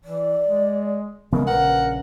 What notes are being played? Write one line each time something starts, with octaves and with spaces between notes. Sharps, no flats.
E3 D5
G#3
C#3 E3 G#3 B3 A#4
A#1 C#3 A#4 B4 F#5